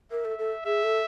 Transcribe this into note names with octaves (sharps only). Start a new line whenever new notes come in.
A#4 E5
A4
A4
G#4 E5
A4